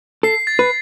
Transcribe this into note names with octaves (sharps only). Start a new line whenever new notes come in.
A4 C7
A6
B4